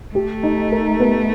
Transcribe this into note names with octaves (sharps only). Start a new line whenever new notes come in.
A3 G4
D#4
A#4
B3